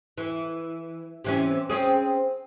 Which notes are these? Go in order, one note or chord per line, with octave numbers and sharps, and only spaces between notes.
E3
C3 E3 C#4
C4 C#4 G#4